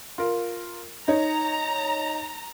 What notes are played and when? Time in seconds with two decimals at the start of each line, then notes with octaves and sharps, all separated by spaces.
0.18 F4 A#4
1.08 D#4 C#5 A#5